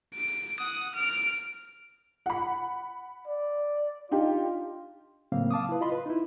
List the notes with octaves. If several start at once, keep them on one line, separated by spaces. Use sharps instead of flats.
D7
F#5 D#6
F6 D7
F#5 B5
D5
D4 D#4 F4 G4
A2 C#3 F#3 A#3 C4 F5
F5 A5 D6 D#6
E4 B4
F4 D#5 B5 C6
B4
D#4 E4